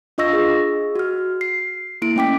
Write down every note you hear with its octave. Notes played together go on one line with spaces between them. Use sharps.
D4 F4 D#5 C#6 E6 A#6
G#4
F#4 F6
C7
A#3 E4 D7
A3 C#4 G5 D6 B6